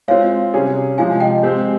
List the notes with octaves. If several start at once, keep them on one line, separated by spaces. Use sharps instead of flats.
G#3 C4 F4 C#5 F5
C3 G3 C#4 G#4
C3 F3 G#3 F5 G#5
D#5 G5
G#3 C4 G4 C5